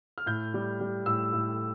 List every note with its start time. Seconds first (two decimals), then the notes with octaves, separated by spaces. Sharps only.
0.18 F6
0.26 A2 G6
0.54 G3
0.81 G3
1.06 A2 E6
1.33 A2